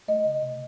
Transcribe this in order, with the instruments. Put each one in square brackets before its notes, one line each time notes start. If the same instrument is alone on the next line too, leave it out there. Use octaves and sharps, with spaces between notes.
[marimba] A3 D#5
C#3
C3